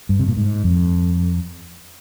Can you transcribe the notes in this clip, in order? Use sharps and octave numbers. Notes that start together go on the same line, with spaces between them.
G2
C3
A#2
G#2
F2